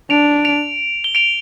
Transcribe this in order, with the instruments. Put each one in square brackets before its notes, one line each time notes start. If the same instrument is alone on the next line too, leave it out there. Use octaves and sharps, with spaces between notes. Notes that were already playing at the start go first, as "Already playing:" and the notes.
[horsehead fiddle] D4 [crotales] D7 F7
[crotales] D7 F7
G7
D7 F7